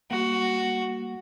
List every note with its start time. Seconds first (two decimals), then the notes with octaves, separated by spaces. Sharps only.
0.11 G3 A#3 F#4